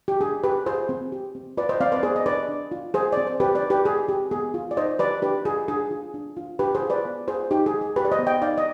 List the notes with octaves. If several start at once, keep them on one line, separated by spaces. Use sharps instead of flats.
G4
D4 G#4
G4 B4
F4 G#4 C5
C4
G4
C4
F4 B4 D5
C5 D#5
C4 D5 F5
B4 D5
B3 G#4 C5
D#5
D4 B4 D5
D4
F4
F4 G#4 C5
C4 D5
C5
C4 G4 B4
B4 D5
D#4
G4 B4
G4 G#4
C4 G4
B3 G#4
F4
D5
D#4 C5 D#5
G4 B4 D5
D4 G4 B4
F4 G#4
D4 G#4
F4
D4
F4
D4 G4 B4
G#4 C5
F4
B4 D5
B3
F4 G#4 C5
D#4 G4
G#4
G4
G#4
F4 G4 B4
D5
C5 D#5
B3
D#5 G5
D#4 D5 F5
D#5